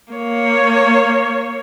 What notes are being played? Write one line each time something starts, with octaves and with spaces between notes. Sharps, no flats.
A#3 C#5